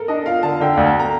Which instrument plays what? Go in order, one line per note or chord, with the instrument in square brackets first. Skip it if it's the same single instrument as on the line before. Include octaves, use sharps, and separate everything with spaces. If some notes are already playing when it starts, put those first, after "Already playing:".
Already playing: [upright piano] A4 A#4
[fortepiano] D4 [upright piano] D#5
[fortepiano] F4 [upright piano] F5
[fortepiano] D3 [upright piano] A5
[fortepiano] D3 [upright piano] G5
[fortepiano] D2 [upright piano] F5
[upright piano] A5
A#5